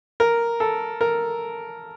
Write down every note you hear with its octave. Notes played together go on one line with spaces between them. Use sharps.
A#4
A4
A#4